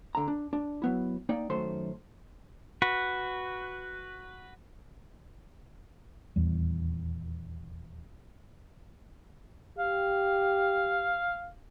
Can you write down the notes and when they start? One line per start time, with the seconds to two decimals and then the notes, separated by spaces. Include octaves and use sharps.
0.15 D3 A#5
0.28 D4
0.53 D4
0.82 F#3 B3 E4
1.29 A#3 D#4 D5 G5
1.50 F#2 D#3 A3 C5 C6
2.82 F#4 B4
6.36 D#1 B1 E2 G3
9.79 G4 F5